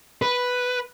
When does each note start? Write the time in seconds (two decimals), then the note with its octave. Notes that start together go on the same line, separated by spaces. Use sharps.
0.22 B4